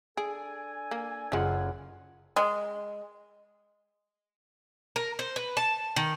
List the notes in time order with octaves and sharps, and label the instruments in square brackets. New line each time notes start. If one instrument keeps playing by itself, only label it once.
[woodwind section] D4 A4 G#5 [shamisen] G#4 [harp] D7
[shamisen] A#3
[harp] F#1 F4 F#5 [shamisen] F3 G#3
[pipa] G#3
[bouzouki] A#4
C5
B4
A5
D#3